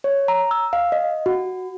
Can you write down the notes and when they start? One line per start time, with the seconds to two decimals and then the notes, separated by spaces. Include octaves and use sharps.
0.04 C#5
0.28 A#5
0.51 E6
0.73 F5
0.92 D#5
1.26 F#4